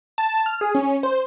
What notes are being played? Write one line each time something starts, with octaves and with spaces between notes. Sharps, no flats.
A5
F6
G#4
C#4
C5